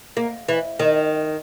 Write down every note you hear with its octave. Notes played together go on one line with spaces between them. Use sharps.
A#3
E3
D#3